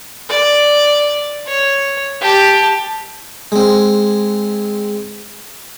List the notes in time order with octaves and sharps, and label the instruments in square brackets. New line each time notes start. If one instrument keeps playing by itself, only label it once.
[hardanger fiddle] D5
C#5
G4 A5
[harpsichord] G#3 C4